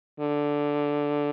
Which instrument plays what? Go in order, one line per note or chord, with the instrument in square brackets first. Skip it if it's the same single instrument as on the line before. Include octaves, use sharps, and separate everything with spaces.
[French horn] D3